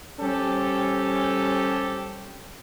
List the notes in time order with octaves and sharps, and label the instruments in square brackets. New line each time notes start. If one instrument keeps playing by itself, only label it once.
[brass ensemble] G3 C4 C#4 G4 A4